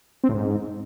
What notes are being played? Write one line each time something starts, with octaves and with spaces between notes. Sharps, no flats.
C4
A2
G#2